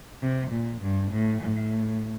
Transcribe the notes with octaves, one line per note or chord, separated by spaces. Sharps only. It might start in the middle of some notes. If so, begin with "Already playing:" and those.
C3
A#2
G2
A2
A2